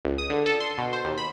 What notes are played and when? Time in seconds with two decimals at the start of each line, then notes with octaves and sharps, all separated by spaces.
0.05 C#2
0.18 D#6
0.30 D3
0.46 A4
0.60 C6
0.78 B2
0.93 C5
1.05 D#2
1.18 B5